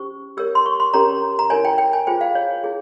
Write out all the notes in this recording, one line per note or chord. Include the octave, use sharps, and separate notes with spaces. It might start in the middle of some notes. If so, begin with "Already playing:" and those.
Already playing: C#4 G4 C5 C#6
G4 A#4 C#5 E6
C6
C#6
C6
C#4 G4 A#4 C#5 A#5
A#5
E4 A#4 C#5 G#5
G5
G5
G#5
F4 G#4 C5 G5
F5
C#5
E4 G#4 C#5